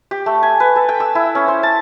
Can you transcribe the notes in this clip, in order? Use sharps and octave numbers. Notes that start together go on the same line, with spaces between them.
G4
A3
G#5
B4
A4
G5
E6
E4
C#4
C5
A5